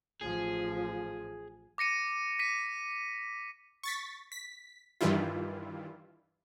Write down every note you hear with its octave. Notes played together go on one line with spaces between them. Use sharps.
A1 F3 G#4
D6 A#6 C#7 D#7
B6 D#7
C#6 A6 B6
B6
G2 D#3 E3 G3 E4 F4